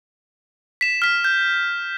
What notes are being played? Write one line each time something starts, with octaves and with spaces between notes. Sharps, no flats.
B6 E7
F6 B6
G6